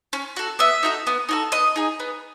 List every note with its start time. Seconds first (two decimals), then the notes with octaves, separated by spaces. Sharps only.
0.13 C#4
0.36 F#4 A4
0.59 B3 E5
0.83 D#4 F#4 A4
1.07 B3
1.29 D#4 F#4 A4
1.52 B3 D#5
1.76 D#4 G#4
2.00 B3